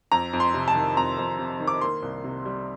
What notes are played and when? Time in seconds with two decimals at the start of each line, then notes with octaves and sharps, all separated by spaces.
0.12 F2 A#5
0.33 F2
0.40 C6
0.54 C3
0.68 A5
0.75 D#3
0.97 F2 A#5
1.18 F2
1.39 C3
1.60 D#3
1.67 D6
1.81 A#3 C6
2.02 C2
2.24 C3
2.45 G3